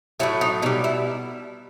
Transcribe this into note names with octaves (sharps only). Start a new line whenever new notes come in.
A2 F#3 A3 E4
D#4
B2 G3 D#4
E4